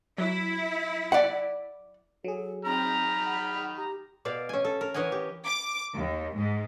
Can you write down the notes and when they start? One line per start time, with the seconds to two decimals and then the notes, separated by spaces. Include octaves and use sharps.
0.18 F#3 E4
1.12 D5 F#5
2.24 F#3 G#4 A4
2.65 D#3 C4 A#5 B5 F6
3.26 F#5
3.77 G4 A#5
4.25 B2 D5 F5
4.49 C#4 G#5
4.65 A4
4.81 A#4
4.94 E3 C#5 D#5 F#5 G#5
5.12 G4
5.45 D6
5.95 D#2
6.35 G#2